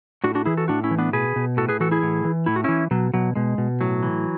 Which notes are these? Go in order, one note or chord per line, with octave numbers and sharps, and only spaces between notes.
A2 D4 F#4
D4 F#4
E3 E4 G#4
F#4 A4
A2 D4 F#4
C#4 E4
E3
B3 D4
B2 G#4 B4
B2
A2 F#4 A4
G#4 B4
E3 F#4 A4
E4 G#4
A2
E3
A2 E4
F#4
E3 C#4 E4
B2 F#3
B2 F#3
B2 G#3
B2
A2 F#3
E3